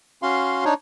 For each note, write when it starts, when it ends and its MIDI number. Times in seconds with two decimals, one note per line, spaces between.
0.23 0.64 61
0.23 0.64 66
0.23 0.64 77
0.23 0.64 84
0.65 0.74 62
0.65 0.74 63
0.65 0.74 73